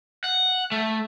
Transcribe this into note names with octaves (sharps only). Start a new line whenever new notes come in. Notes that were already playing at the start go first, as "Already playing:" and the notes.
F#5
A3